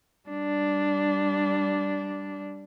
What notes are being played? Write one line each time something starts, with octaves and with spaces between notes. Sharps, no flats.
G3 D4